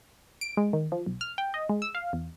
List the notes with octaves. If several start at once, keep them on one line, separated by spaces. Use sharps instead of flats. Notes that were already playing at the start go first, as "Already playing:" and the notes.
D7
G#3
D#3
F3
B1
F6
G5
D#5
G#3
E6
F5
E2